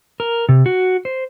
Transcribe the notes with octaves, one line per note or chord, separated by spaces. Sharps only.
A#4
C3
F#4
C5